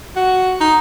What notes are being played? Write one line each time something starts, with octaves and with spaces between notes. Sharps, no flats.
F#4
D#4